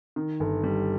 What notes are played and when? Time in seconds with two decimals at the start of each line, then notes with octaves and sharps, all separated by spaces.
0.16 D#3
0.40 G1
0.64 G3